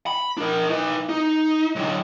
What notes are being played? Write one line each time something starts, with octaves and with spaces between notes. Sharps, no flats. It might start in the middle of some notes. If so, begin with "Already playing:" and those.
B5
D4 A#4
D#4 B4
D#4
D3 F#3